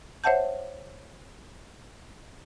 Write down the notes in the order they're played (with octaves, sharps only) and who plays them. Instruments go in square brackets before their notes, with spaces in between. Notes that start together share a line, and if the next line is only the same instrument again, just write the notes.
[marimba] C5 C#5 E5 F#5 A5 G6